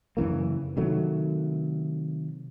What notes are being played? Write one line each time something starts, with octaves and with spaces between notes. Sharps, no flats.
F#2 C#3 E3 A#3
C3 D#3 F#3 A3